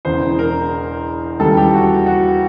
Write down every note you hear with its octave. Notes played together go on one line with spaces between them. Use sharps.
E1 E2 C#3 C5
A#4
D#2 C#3 E3 G3 A4
G4
F#4
F#4